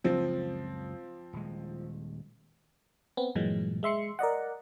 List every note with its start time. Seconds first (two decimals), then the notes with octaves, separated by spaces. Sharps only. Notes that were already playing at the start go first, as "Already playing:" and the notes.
0.04 F#1 C#2 C#3 F3 C4
1.33 D#1 G#3
3.17 B3 C4
3.35 G2 A#2 E3 F#3 G#3
3.83 G#3 E5 C6 C#7
4.19 A#4 D5 D#5 F#5